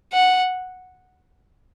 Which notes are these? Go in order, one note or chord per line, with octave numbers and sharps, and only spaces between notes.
F#5